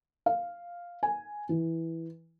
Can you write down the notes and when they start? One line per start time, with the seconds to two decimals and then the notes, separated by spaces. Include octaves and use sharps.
0.26 F5
1.03 G#5
1.49 E3